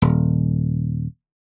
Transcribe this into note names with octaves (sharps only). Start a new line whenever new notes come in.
D#1